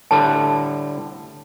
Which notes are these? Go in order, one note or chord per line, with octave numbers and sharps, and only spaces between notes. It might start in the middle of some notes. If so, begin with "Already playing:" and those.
A2 D3 G3 A5